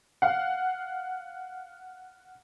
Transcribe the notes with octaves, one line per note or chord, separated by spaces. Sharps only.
F5 F#5